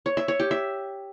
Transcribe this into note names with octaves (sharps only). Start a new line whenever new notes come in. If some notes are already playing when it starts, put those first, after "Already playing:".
C#5
E5
C#5
G4
E5